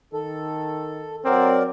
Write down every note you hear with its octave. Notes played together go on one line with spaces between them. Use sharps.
D#3 A4
F#3 C4 A#4 D5